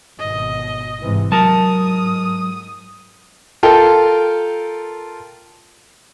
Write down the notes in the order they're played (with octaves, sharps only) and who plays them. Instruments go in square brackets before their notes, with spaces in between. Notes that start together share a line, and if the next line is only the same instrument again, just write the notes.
[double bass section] G#1 B2 [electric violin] D#5
[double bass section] G#2 C3 E3
[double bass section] G#2 [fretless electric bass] F#3 [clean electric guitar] A#4 A5 [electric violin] D#6
[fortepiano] F4 A4 A#4 G5